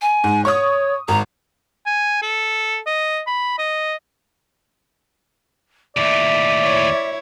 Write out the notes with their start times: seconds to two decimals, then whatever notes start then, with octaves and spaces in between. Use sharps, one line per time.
0.02 G#5
0.24 G#2
0.45 C#5 C#6 D#6
1.08 G#1 A#5
1.86 G#5
2.22 A4
2.86 D#5
3.27 B5
3.58 D#5
5.97 D#2 A2 D5 E5
6.62 E4 C#5